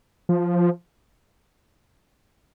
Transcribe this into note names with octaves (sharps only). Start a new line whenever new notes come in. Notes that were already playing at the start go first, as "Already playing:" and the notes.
F3